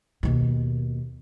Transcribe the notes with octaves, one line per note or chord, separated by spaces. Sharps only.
D#2 B2